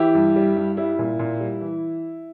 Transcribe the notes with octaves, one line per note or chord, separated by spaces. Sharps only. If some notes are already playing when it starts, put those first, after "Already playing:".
Already playing: E3 E4 G4
G2
G3
G2
G3 E4
A#2
A#2
G3
E3